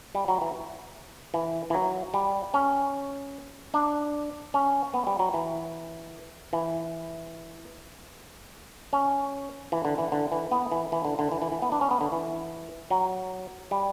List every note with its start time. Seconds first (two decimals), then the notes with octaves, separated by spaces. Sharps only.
0.15 G3
0.28 F#3
0.41 E3
1.34 E3
1.70 E3
1.74 F#3
2.14 G3
2.54 C#4
3.74 D4
4.54 C#4
4.94 B3
5.07 G3
5.19 F#3
5.34 E3
6.53 E3
8.93 C#4
9.72 E3
9.85 D3
9.98 E3
10.12 D3
10.32 E3
10.51 B3
10.72 E3
10.92 E3
11.05 D3
11.19 D3
11.32 E3
11.42 E3
11.52 E3
11.62 B3
11.72 D4
11.81 C#4
11.91 B3
12.01 D3
12.12 E3
12.91 F#3
13.71 G3